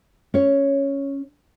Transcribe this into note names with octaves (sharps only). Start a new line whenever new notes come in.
C#4 C#5